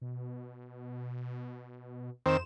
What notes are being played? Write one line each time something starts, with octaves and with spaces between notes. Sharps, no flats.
B2
F2 D#3 C4 C5 E7